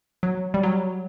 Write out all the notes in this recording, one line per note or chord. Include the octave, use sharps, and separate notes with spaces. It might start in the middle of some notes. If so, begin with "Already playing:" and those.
F#3
G3
F#3